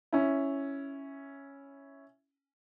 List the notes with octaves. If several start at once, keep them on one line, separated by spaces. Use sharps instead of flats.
C#4 E4